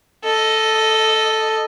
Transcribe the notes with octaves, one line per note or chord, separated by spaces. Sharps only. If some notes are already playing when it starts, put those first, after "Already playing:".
A4 D#5